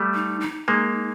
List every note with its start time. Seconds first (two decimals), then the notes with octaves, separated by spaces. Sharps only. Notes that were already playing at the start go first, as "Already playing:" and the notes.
Already playing: G3 A3
0.14 D#4
0.41 D#4
0.68 G#3 A#3